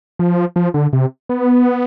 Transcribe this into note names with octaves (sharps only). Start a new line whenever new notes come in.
F3
F3
D3
C3
B3